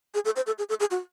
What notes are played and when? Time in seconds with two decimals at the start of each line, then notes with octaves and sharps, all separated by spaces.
0.14 G#4
0.25 A4
0.36 C5
0.47 A4
0.58 G#4
0.69 A4
0.80 G#4
0.91 F#4